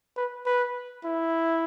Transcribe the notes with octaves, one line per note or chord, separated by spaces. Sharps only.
B4
B4
E4